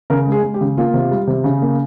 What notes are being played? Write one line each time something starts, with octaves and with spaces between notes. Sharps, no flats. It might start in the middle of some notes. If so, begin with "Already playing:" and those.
C#3 A#4
G#3
G#4
G#3
G4
C#3
A#3 F4
C3
G3
C3
C#3
A#3